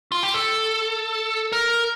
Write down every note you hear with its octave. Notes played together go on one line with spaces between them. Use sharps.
F4
G4
A4
A#4